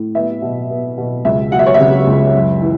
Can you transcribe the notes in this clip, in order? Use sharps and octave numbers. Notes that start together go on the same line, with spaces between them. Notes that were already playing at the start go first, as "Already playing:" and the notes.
Already playing: A2
B3 E5
B2
B3
B2
C#2 E5
F#3 F#5
E5
C#5
C#3 E5
C#2
F#2
E3